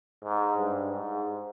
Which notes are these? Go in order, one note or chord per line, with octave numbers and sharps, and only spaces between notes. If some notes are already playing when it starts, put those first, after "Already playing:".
G#2
G2
G#2